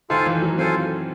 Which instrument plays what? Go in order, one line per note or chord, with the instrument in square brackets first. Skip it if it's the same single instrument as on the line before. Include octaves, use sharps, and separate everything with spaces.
[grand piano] D#3 [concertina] F4 A4 C5 F5 G#5
[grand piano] E3
F#3
[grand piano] C4 [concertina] F4 A4 C5 F5 G#5